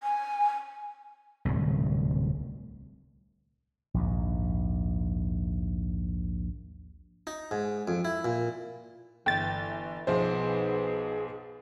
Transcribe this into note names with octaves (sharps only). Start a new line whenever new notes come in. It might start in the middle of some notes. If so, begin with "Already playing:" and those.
G#5
D1 C2
A#1 D#2 G#2
D#4
G#2
F2
E4
A#2
G1 E3 G5 A6
B1 F3 B3 D#4 G#4 C5